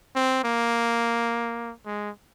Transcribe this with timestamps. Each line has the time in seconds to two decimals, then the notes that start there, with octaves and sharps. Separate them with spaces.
0.15 C4
0.44 A#3
1.86 G#3